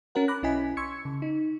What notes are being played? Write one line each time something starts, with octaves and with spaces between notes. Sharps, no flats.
C#4 F#4 A#4 F#5
B5 D6 F#6 A#6
B1 C#4 E4 D#5 G#5 B6
C6 C#6 E6 G#6 C#7
C#3
D#4